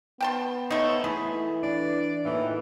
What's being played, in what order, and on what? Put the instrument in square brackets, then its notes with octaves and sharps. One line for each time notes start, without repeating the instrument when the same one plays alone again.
[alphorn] B3 [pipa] G5 A5 C6
[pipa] A3 D#4 [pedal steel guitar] C5 C#5
[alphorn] E3 [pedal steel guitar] A3 A4 B5 [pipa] G#4
[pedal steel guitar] D4 [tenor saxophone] D5
[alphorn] A2 [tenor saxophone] E3 [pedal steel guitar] A#3 D#4 F4